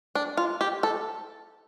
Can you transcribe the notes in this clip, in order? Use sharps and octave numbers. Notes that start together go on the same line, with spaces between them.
D4
F4
G4
A4